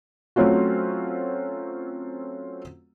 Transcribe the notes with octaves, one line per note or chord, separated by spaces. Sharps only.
F#3 A3 C4 C#4 F4 F#4